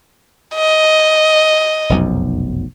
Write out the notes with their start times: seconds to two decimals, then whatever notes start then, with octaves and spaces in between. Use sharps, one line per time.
0.55 D#5
1.89 F1 B1 F#2